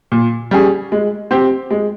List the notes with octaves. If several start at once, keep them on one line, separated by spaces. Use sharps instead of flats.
A#2
G3 C#4 G#4
G#3
C4 G4
G#3